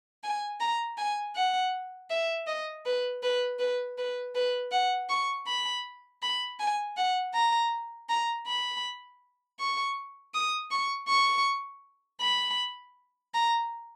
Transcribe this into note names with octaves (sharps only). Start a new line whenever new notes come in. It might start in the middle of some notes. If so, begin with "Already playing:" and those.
G#5
A#5
G#5
F#5
E5
D#5
B4
B4
B4
B4
B4
F#5
C#6
B5
B5
G#5
F#5
A#5
A#5
B5
C#6
D#6
C#6
C#6
B5
A#5